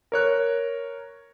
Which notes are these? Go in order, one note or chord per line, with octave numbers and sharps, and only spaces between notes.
A#4 C#5 F#6